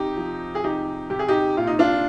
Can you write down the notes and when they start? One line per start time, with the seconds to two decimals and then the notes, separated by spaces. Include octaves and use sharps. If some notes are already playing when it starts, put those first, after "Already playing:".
Already playing: C3 D#4 G4
0.17 F3
0.55 G#4
0.64 C3 D#4 G4
1.10 C3 G4
1.19 G#4
1.28 D#4 G4
1.57 A#2 F4
1.67 D#4
1.79 D4 F4